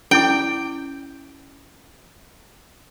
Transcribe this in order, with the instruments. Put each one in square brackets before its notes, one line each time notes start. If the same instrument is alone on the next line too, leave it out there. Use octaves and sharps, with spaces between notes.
[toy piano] C#4 E4 D6 [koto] G5